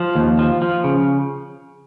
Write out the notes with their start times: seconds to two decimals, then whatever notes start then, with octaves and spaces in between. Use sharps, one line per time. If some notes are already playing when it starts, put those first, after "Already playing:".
Already playing: F3
0.15 D#2
0.39 F3
0.62 F3
0.84 C#3